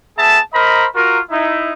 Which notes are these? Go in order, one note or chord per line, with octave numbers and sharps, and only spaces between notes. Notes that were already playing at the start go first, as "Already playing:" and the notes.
B3 G#4 E5 A5
A#4 C5 D#5 A#5 B5
F4 F#4 A#4
D#4 E4